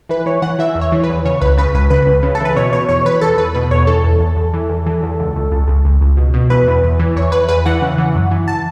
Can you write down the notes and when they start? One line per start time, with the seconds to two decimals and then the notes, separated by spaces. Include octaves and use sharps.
0.09 E3 B4
0.26 E3 C#5
0.42 E3 F#5
0.59 E3 E5
0.75 E2
0.81 C#5
0.92 E3
1.03 B4
1.09 E2
1.25 C#3 C#5
1.41 C#2 B4
1.57 C#3 B4
1.75 C#2 B4
1.90 C#3 B4
2.07 C#2
2.23 C#3
2.35 A4
2.40 E3
2.45 B4
2.56 B2 C#5
2.73 B2 C#5
2.89 E2 C#5
3.05 E2 B4
3.21 E2 A4
3.38 E2 B4
3.55 B2 B4
3.71 E2 C#5
3.87 E3 A4
4.04 E2
4.20 E2
4.36 E2
4.53 E3
4.69 E2
4.86 E3
5.03 E2
5.20 C#2
5.36 C#2
5.52 C#2
5.68 C#2
5.85 C#2
6.01 C#2
6.17 B2
6.34 B2
6.50 E2 B4
6.67 E2
6.84 E2
6.99 E3
7.16 E2 C#5
7.32 E2 B4
7.49 E2 B4
7.66 E3 F#5
7.82 C#3
7.98 E3
8.15 F#2
8.31 E3
8.48 A5